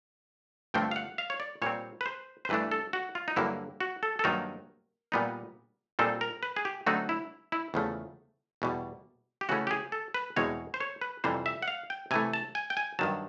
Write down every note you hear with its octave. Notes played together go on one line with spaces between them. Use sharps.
G2 D3 F3 A3 C4 G5
F5
F#5
F5
C#5
D5
A#2 G3 C4 C#5
B4
C5
C5
G2 E3 A3 D4 B4
A4
F#4
F4
D#4
G2 D3 F#3 A#3 E4
F#4
A4
A4
G2 D#3 F#3 A#3 D#4 A#4
A#2 G3 B3 D#4
A#2 G3 C4 D#4 A4
A#4
B4
G#4
G4
D3 F#3 A3 C4 D#4 F#4
E4
E4
E2 C#3 F3 A3
E2 B2 G3
G4
C#3 E3 A3 C#4 F#4
G4
G#4
A4
B4
E2 B2 G#3 C4 C#5
C5
C#5
B4
F2 C3 E3 G3 C5
E5
F#5
F5
G5
C3 E3 A3 G#5
A5
G#5
G5
G#5
G2 D#3 F#3 A5